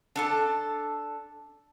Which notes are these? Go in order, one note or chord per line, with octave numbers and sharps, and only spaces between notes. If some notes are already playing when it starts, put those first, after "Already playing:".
D4 A4 A5